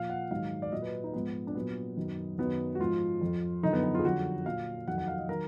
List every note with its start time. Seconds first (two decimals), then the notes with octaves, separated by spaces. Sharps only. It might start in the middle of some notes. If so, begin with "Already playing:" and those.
Already playing: A#2 F3 F5
0.10 F#5
0.31 G#2 D#3 F#3 F5
0.62 D5
0.72 A#2 F#3 D#5
0.82 B4
1.04 D#4
1.13 G#2 F3 B3
1.47 D4
1.55 A#2 F#3 B3
1.97 F#2 D#3 F#3
2.38 F#2 D#3 F#3 B3
2.75 F#4
2.80 G#2 F3 F4
3.21 F2 F3
3.63 F#2 D3 F3 D#4
3.73 B3
3.83 B3
3.95 F4
3.99 G#4
4.04 F2 D3 F#3 F#4
4.46 A#2 F#3 F5
4.87 F2 D#3 F#3 F#5
4.98 F#5
5.08 F5
5.18 D#5
5.29 D#3 F#3 A#4